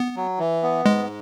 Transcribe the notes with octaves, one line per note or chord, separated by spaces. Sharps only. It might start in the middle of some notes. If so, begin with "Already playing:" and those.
Already playing: B3
F#3
E3
B3
G#2 G#3